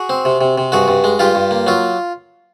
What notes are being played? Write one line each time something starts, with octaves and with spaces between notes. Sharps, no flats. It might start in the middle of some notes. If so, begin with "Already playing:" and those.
Already playing: F#4 G#4
C4
C3
C3
C3
G2 F#4 G#4
G2
G#3
G2 F4 G4
G2
A#3
F#3 F4